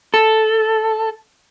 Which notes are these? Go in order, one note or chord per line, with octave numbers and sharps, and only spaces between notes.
A4